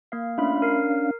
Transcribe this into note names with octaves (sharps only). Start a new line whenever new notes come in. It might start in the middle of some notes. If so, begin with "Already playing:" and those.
A#3 F5
A3 C#4 D4 F4 F5 B5
A#4 C7